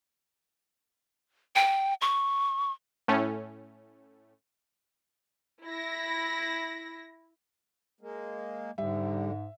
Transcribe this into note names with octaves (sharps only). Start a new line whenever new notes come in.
G5
C#6
A2 A3 C#4
E4 A#6
G#3 A#3
G#2 D3 G3 E5